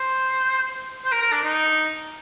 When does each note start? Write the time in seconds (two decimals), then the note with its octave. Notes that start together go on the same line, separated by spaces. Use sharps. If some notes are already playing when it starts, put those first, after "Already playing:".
Already playing: C5
1.05 C5
1.12 A#4
1.22 A#4
1.32 D4
1.44 D#4